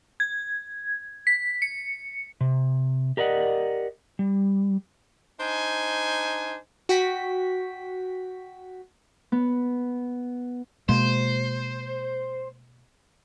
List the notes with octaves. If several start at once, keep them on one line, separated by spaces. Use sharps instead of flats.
G#6
B6
C#7
C3
G4 A#4 D5 D#5 F#5
G3
D4 D#4 C5 G#5
F#4 G5 B6
B3
B2 G#3 A#3 C5